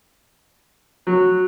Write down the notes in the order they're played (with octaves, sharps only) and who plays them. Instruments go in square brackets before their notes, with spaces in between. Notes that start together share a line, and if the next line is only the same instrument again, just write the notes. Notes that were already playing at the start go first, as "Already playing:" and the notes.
[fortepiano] F#3